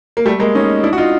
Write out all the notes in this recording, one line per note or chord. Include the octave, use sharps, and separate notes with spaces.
A#3
G3 A3
G#3 A#3
C#4 D#4
D4 E4
F#4
D#4 F4